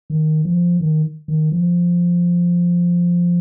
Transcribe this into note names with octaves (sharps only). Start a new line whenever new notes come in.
D#3
F3
D#3
D#3
F3